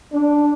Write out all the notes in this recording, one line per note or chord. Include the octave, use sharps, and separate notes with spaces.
D4